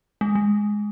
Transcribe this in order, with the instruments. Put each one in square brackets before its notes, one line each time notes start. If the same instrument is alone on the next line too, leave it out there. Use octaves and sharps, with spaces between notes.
[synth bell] G#3
G#3